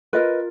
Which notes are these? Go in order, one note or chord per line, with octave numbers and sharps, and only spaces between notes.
F4 A#4 B4 D#5